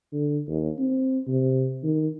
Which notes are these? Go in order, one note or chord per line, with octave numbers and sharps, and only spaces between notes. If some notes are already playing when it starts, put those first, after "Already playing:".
D3
D#2
C4
C3
D#3